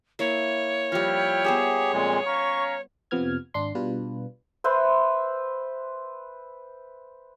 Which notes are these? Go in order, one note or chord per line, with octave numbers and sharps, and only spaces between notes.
A#3 E4 C#5
F3 G3 E4 G5 F6
B3 G4 G#4 C5 E5
F2 A#2 G#3 G#4
C#4 F5 A#5 C#6
F2 C3 F3 B3 F6 G#6
G#1 D4 C6
B2 G3 D4 F4 B4
B4 C5 E5 C6